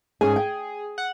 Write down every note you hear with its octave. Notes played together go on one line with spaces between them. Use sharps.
G#2 C#4 G#4 G#5
G5
F#5